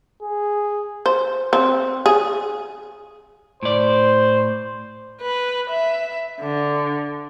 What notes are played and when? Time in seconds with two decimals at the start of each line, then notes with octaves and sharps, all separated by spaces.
0.22 G#4
1.06 C5
1.53 C4
2.06 G#4
3.63 A2 C5 D5
5.21 B4
5.70 E5
6.41 D3